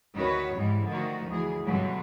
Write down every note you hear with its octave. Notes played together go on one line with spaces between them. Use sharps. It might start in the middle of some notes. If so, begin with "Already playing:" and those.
D2 D#3 F#4 B4 C#5
G#2 E3 G3 G#3
D3 D#3 F3 A3 D#4 F#4
D2 E3 G#4
G2 B2 D3 E3 F#3 G3